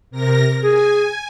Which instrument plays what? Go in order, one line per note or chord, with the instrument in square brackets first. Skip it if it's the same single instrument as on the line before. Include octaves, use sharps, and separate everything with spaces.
[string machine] C3 A#4 A#6
[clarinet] G#4 [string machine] G#5